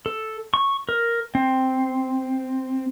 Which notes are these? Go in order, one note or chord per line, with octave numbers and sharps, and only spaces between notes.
A4
C#6
A#4
C4